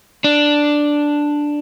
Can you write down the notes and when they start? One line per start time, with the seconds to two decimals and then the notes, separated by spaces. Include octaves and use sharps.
0.24 D4